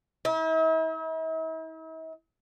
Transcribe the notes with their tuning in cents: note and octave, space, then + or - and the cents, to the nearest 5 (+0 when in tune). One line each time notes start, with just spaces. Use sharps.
E4 -45